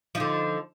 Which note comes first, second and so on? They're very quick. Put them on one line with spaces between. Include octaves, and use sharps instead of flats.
F3 D#4 D3